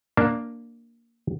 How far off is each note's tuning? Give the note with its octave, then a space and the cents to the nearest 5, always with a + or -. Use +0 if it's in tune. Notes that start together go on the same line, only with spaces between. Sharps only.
A#3 +0 D4 +0 A5 +0